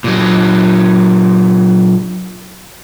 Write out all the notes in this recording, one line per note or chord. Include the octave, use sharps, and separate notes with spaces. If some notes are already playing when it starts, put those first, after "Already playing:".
A#2 F#3